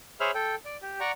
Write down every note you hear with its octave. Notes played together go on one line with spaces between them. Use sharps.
G#4 C5 C#5 E5 B5 F6
A4 G5
D5
G4
D5 F#5 A#5 C#6